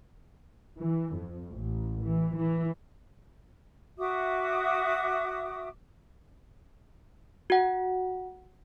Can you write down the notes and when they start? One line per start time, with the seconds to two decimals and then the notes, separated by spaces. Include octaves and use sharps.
0.79 E3
1.18 F2
1.57 A1
2.04 E3
2.38 E3
3.98 F#4 E5 D6 D#6
7.50 F#4 F#5